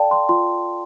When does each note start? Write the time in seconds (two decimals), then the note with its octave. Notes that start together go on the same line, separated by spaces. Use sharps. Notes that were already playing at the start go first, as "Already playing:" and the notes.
Already playing: A4 D5 F5 G5 A5
0.11 C6
0.29 F4 C6